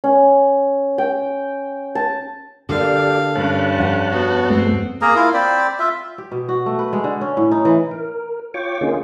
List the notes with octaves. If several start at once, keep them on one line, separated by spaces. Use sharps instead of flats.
C#4
G5
A5
D3 A#3 G4 A4 D5 F5
G2 C#4 C#5 A5 F#6
F2 F#5
B3 F#4
G2 G#3 A3 C4
A#3 G#4 A#4 A#5
E4 F4 A#4 F5
C4 C5 D5 B5
F4 E5
G4
B2
F#4
A3
B4
G#3
D3
C#4
A2
D#4
E3
A#4
F4 C#5 G5 C#6 D6
D3 A#3 C#4 D#4 F4 G#4